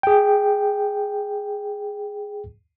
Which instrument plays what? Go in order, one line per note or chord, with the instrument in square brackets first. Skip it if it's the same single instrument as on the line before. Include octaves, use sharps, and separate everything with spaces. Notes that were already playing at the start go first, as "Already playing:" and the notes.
[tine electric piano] G#4 G5